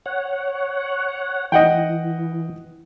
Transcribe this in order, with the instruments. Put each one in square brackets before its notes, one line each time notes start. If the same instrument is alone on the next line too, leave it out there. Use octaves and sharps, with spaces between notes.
[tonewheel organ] C#5 F#5
[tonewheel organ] E3 [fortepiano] D#5 F#5 G5